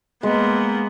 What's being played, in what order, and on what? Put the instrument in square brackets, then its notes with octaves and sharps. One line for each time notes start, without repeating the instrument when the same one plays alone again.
[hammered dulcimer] G#3 [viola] A#3 B3